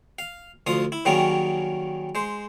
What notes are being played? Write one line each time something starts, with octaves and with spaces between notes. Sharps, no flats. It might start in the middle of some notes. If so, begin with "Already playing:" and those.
F5
D2 F3 F5 D#6
E4
D#3 F#3 G3 A#3 C#4 G#4
G#3 C5